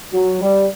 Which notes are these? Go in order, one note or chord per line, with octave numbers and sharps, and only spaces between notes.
F#3
G3